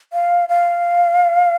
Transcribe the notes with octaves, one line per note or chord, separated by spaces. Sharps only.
F5
F5